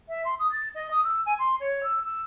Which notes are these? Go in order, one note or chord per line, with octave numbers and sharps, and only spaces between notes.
E5
C6
D#6
A6
D#5
D#6
E6
G#5
C6
C#5
E6
E6